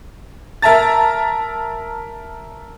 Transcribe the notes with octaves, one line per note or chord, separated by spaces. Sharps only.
A#4 E5 A5 A#5 A6